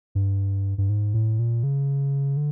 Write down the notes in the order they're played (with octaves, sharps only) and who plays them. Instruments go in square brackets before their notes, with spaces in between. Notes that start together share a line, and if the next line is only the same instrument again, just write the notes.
[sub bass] G2
G2
G#2
A2
A#2
C#3
D3